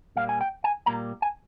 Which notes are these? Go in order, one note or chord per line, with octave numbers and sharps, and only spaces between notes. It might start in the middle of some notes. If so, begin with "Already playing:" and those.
A#2 G3 A#3 F5
G#5
G5
G#5
A#2 G3 A#3 A#5
G#5